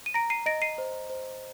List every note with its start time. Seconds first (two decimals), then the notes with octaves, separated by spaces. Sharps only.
0.06 D#7
0.14 A#5 A#6 D7
0.30 C7 D#7
0.46 D#5 A#6 D7
0.62 C7 D#7
0.78 C5
1.10 C5